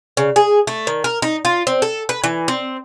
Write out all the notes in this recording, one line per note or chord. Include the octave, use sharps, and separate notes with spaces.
C#3
G#4
A3
D#3
A#4
D#4
F4
C4
A4
B4
E3
C4